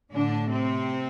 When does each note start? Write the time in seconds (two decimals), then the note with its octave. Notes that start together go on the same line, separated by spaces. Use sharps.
0.13 A2 D3 D4
0.49 C3 C4